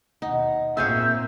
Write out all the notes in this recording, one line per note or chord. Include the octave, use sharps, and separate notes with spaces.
D#2 B2 D#4 F#5
A#2 A#3 C4 F4 G#4 C#5 E5 G6